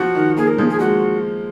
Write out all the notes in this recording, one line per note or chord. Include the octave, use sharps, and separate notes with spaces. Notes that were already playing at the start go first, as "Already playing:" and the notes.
Already playing: F3 F#4
D#3
A#3 G#4
A#4
F3 G#4
G#4
G#3 F#4